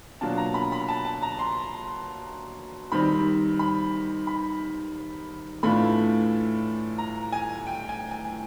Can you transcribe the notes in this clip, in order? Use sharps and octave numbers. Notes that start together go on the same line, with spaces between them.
B2 F#3 A#3 D4 F4 A5
A#5
B5
B5
A5
A5
A#5
C6
D#3 G3 C4 D#4 B5
B5
B5
A2 E3 A3 D4 F4 B5
A#5
G#5
G5
G#5
G#5